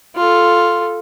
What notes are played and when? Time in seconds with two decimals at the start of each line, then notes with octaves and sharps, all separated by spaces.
0.16 F4 A4